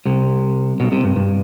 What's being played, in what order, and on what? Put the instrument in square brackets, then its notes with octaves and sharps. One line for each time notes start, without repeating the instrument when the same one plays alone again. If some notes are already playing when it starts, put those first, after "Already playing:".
[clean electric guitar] C2 C3
B1 B2
C2 C3
G2
G2